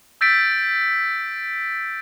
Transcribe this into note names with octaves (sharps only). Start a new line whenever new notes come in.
E6 G6 A6 B6 D7